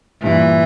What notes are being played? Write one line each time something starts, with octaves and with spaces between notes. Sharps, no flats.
G2 A#2 E3